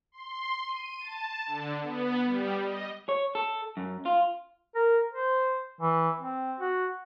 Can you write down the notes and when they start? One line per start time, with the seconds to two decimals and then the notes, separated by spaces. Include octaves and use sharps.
0.12 C6
0.68 D#7
1.00 A5
1.47 D3
1.82 B3
2.26 G3
2.63 D#5
3.09 C#5
3.35 A4
3.77 F#2
4.06 F4
4.75 A#4
5.12 C5
5.81 E3
6.20 C4
6.60 F#4